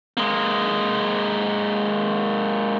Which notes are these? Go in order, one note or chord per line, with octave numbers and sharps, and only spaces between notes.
G#3 A#3